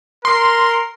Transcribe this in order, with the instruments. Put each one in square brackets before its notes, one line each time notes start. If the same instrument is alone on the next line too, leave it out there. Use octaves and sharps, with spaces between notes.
[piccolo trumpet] A#4 [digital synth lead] C6